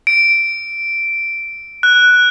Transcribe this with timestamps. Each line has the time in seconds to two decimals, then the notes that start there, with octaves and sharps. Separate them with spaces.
0.07 D7
1.83 F#6